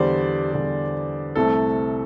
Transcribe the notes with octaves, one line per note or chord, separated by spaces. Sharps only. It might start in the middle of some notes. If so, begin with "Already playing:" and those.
Already playing: E2 D3 G3 C5 D5
E2 D3 G3
C2 C3 A3 A4